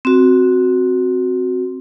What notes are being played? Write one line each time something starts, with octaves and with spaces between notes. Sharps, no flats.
C4 F#4